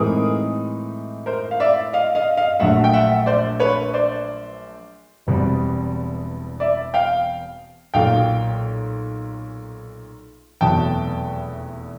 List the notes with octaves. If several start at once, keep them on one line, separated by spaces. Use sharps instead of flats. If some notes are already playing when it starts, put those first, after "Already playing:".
Already playing: A2 E3 G#3 C4 D#4 G#4 A#4
A#4 C5
F5
D5 E5
D#5 F5
D#5 F5
D#5 F5
A#1 A#2 F#3 A3 E5 F#5
G5
E5 F#5
C5 D5
B4 C#5
C5 D5
E1 E2 B2 G3 C4
D5 E5
F5 G5
B1 A#2 F#3 F5 G5
F1 E2 B2 F#3 G5 A5